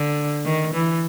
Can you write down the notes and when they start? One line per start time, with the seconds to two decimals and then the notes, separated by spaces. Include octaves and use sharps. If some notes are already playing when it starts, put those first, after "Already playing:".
Already playing: D3
0.45 D#3
0.74 E3